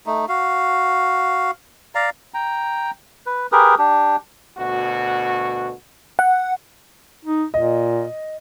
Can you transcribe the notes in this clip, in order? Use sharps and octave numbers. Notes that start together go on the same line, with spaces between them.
A3 D#4
F#4 F5
D5 F5 A#5
G5 A#5
B4
G4 G#4 A#4 B4
D4 G4
D2 B2 F#4
F#5
D#4
A#2 D#5